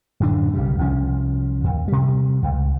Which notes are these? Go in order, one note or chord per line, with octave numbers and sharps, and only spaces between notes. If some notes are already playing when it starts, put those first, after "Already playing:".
D1 F#2 D3 D4
B1 C#3 G3
C2 F3 C#4
D#2
C3 G3
C#2